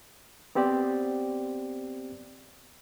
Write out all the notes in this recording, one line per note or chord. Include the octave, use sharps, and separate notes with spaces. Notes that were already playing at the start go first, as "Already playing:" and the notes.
B3 C4 G4 C5 D5 G5